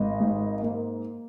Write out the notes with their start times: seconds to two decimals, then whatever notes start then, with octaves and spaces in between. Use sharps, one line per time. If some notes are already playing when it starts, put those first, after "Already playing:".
Already playing: G#1 D#5
0.20 G#2
0.61 A#3